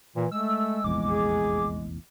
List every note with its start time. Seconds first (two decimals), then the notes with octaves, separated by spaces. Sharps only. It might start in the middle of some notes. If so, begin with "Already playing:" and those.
0.16 A#2 E3
0.32 G#3 A3 E6
0.84 F1 A#1 E2 D6
1.08 G#4